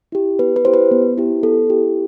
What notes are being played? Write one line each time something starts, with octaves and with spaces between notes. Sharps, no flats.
E4 G4
B3 B4
B4
E4 G4 C5
B4
B3
E4 G4
B3 A4
E4 G4